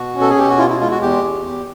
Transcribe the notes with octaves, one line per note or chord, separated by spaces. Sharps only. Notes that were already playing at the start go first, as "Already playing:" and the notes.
Already playing: B2 F#4
C#4
A4
G#4
B2 G4
F#4
E4 F4
E4
G#3 F4
F#4
E2 G4
E2
E2